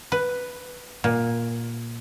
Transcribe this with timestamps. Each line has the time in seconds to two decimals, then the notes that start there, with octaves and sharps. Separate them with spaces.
0.12 B4
1.04 A#2